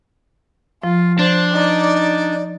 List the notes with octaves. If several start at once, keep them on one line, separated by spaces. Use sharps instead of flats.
F3 F4
D4 C5
D#4 D5